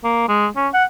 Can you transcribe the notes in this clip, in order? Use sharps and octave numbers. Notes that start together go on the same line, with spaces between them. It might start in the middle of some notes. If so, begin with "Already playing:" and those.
A#3
G#3
C#4
F#5